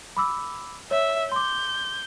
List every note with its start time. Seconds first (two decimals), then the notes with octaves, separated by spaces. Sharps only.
0.17 B5 D6 E6
0.91 C#5 E5
1.32 C6 D6 G6